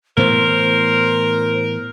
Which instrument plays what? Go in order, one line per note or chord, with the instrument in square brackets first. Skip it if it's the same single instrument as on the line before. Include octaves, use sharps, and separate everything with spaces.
[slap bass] A2 E3 B3 [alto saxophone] A#4 [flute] C5